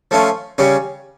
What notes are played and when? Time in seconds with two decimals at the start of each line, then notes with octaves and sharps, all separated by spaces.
0.11 F3 A3 C#4 F4
0.58 C#3 G3 C#4